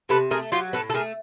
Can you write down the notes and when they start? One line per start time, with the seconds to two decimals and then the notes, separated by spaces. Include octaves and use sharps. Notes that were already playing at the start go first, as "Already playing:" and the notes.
0.09 C3 A4 B4
0.31 A3 G#4 A#4
0.52 F#3 F4 G4
0.73 A2 A4 B4
0.90 A4
0.94 A3 G#4 A#4